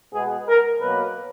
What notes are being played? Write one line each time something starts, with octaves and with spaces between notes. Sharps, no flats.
B2 G#3 B3 G#4
A#4
B2 F#3 A#3 B4